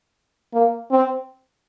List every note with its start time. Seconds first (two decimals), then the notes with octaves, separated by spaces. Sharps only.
0.53 A#3
0.91 C4